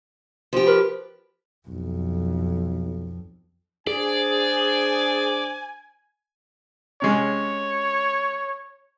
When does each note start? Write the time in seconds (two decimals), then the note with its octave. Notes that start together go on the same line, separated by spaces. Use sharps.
0.53 F3 G4
0.67 A#4 B4
1.68 B1 F2
3.87 D4 G#4 C5 D5 G#5
7.02 C3 G#3 C#4 C#5